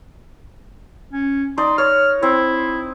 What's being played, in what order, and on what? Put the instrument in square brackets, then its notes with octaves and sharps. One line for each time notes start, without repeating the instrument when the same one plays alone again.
[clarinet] C#4
[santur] D#4 D5 [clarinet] C6
[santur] C#5 [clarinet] F6
[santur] C4 [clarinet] E4